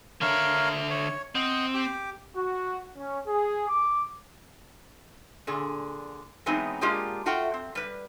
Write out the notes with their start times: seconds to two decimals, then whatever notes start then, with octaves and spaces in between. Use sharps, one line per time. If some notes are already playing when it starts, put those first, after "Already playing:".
0.21 D3 A#4 C#5 E5 F5
0.90 C#5
1.35 C4 D#5 F#5
1.74 G4 D6
2.36 F#4
2.97 C#4
3.27 G#4
3.69 D6
5.47 A#2 D3 G#4
6.46 E3 F#3 G#3 B3 C4 D#4
6.81 G#3 A#3 D4 F4 G4 G#4
7.26 A3 F4 F#4 F#5 G5
7.54 C4
7.75 G3 B4